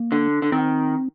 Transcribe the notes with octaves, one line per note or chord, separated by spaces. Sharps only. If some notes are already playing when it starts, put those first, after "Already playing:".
Already playing: A#3
D3
D3
D#3 C4